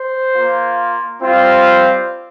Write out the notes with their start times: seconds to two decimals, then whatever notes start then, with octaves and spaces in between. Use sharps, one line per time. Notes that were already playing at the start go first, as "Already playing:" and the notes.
Already playing: C5
0.35 A#3 F4
1.22 G3 C4 F4